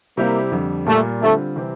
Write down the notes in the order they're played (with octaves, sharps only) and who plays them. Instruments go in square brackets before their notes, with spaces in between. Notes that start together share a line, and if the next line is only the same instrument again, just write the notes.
[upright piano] C3 G3 C4 E4 G4 [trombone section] A#3
[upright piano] F2 D3 G3
[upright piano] A#2 G3 A#3 F4 [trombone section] A3
[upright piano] D3 G3 C4 F4 [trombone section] A3
[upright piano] C3 E3 G3 C4 G4